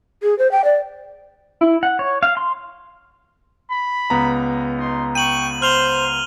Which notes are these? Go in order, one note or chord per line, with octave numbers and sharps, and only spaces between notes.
G#4
C5
G5
D5
E4
F#5
C#5
F5
C6
B5
C#2 B3 A#5
D#4 C6
G5 C#6 D#7 F#7
C5 F6 F7 G7